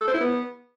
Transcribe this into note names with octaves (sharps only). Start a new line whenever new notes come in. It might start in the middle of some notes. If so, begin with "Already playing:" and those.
A4
C5
E4
B3